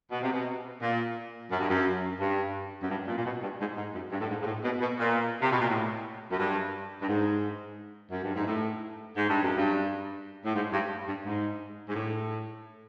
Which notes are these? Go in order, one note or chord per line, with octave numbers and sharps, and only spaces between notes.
B2
C3
B2
A#2
F#2
G2
F#2
G2
F#2
G2
A#2
A#2
B2
G2
G#2
G#2
F#2
G2
A2
G#2
G#2
A2
B2
B2
A#2
C3
B2
A#2
A2
F#2
G2
G2
G#2
F#2
G2
G#2
A2
G#2
G2
F#2
G2
A2
G#2
G2
G2
G#2
G#2
A2